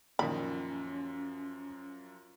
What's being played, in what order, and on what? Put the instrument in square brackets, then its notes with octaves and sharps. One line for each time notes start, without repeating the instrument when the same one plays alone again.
[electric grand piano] F#2 F3 [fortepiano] A#2 D#3 [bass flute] C#4 [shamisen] B5